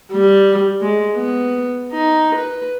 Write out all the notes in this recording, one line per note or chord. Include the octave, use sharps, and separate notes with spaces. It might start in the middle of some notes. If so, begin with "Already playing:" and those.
G3
G#3
B3
D#4
B4